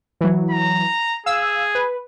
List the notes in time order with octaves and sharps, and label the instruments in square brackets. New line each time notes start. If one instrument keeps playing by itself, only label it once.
[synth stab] E3 F#3
[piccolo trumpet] A#5
[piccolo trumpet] G#4 [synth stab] F5 E6
[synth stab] B4